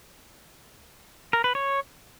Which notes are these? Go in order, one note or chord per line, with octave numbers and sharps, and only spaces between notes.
A#4
B4
C#5